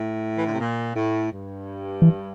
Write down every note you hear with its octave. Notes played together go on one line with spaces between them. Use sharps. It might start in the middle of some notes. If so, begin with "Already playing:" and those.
Already playing: A2
E3
D3
C3
A#2
A2
G2
E3